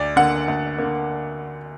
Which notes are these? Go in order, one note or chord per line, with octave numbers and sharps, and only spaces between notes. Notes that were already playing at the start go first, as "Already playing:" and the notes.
Already playing: D2 D5
D3 A#3 F#5
D2
D3 A#3